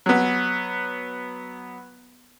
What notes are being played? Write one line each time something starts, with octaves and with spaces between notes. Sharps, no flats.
F#3 B3